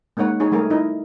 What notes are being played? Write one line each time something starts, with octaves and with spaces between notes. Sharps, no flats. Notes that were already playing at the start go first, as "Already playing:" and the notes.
G#3 A#3 D#4 C#5 F#5
D#4 G#4 C#5
G3 A3 G#4 A#4
D#4 E4 A#4 D#5